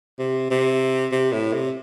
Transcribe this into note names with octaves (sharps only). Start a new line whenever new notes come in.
C3
C3
C3
A2
C3